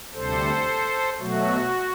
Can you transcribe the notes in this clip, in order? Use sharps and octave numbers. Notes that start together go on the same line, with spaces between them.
D2 C3 G3 A4 C5
B2 F#3 A3 F#4